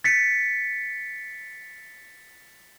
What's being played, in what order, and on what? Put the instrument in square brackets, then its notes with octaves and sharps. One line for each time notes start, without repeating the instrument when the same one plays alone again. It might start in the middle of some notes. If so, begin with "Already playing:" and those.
[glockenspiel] A6 B6 C#7